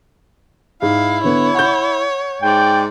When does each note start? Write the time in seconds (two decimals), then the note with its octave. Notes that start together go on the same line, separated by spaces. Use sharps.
0.82 G#2 E4 F5
1.24 D3 B3 C#5
1.55 F#5 C#6 G6
2.42 G#2 D5 G5